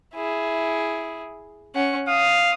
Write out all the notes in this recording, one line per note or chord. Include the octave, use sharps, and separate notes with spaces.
E4 G#4
C#4 F#5
F5 D#6